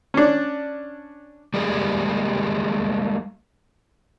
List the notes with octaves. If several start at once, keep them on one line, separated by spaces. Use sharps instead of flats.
C#4 D4
G3 G#3 A#3 G4 G#4